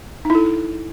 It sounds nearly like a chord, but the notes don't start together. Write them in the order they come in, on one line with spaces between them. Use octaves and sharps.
D#4 E4 A4